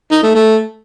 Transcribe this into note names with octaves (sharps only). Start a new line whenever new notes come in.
D#4
A3
A3